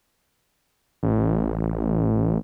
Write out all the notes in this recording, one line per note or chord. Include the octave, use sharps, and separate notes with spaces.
A1